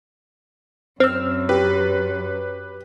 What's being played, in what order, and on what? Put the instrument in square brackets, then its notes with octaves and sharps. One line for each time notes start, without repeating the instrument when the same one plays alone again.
[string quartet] F#2 [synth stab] C4 [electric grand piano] E6 F6
[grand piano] G4 [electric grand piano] B4